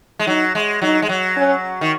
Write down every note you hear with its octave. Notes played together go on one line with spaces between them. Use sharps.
G#3
F#3 D#4
G#3
F#3 D#4
G#3
F#3
C#4
D#3